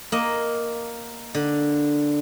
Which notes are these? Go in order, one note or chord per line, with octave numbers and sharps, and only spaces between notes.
A#3 D#5
D3